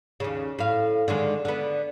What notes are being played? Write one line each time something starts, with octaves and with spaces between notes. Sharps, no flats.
D#2 C#3
A2 F5
D3 D#3 G#3
D3 B3